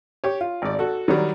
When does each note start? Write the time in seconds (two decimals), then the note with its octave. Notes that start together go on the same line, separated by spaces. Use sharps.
0.24 G4 C#5
0.41 F4
0.62 G#1 D5
0.79 F#4 A4
1.08 D#3 F#3 G3